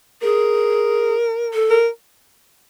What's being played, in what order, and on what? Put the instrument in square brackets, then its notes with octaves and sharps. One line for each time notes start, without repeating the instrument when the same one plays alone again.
[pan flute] G#4 [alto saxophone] A#4
[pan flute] A4
[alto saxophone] A#4